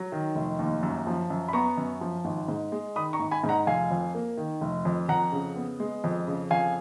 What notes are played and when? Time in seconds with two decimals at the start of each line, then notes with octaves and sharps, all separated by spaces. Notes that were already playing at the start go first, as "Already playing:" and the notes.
Already playing: F#3
0.12 D#3
0.35 F1
0.59 D#2
0.83 F#2
1.07 F3
1.30 F#2
1.48 B5
1.53 B3 A#5 C#6
1.77 F#2
2.01 F3
2.25 G#1
2.48 G#2
2.72 G#3
2.96 D#3 B5 D#6
3.13 A#5 C#6
3.20 G#1
3.31 G#5 B5
3.44 G#2
3.49 F#5 A#5
3.67 F1 F5 G#5
3.91 F2
4.14 A#3
4.37 D#3
4.61 F1
4.85 F2
5.09 F2 F#5 A#5
5.32 C#3
5.56 B3
5.80 G#3
6.04 F2
6.27 C#3
6.50 F2 F5 G#5